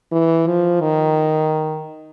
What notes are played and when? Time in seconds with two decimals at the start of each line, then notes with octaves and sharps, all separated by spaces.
0.12 E3
0.47 F3
0.81 D#3